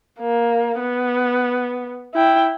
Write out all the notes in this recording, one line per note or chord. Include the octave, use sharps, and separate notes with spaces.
A#3
B3
E4 G5